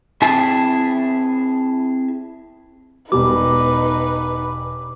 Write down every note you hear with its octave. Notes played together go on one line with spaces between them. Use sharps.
C4 E4 G#4 E5 A5
E1 G3 D#4 B4 D6